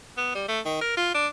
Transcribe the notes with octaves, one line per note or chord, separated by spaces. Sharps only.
B3
G3
A3
D#3
A#4
F4
D4